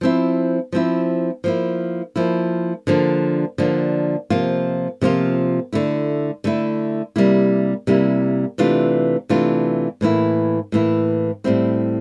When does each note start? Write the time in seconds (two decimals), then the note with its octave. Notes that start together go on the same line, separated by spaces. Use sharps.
0.01 F3 C4 E4
0.72 F3 C4 E4
1.44 F3 A#3 E4
2.16 F3 A#3 E4
2.87 D3 F3 A#3 D4
3.58 D3 F3 A#3 D4
4.30 C3 F3 A#3 F4
5.01 C3 F3 A#3 F4
5.73 D3 A3 E4
6.44 D3 A3 E4
7.16 C3 G3 A#3 E4
7.87 C3 G3 A#3 E4
8.58 C3 E3 A3 D4 F4
9.29 C3 E3 A3 D4 F4
10.01 A2 E3 A#3 E4
10.72 A2 E3 A#3 E4
11.44 A2 G3 C4 E4